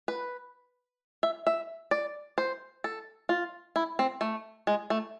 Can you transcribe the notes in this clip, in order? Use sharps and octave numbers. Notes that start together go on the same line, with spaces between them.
B4
E5
E5
D5
C5
A4
F4
E4
C4
A3
G#3
A3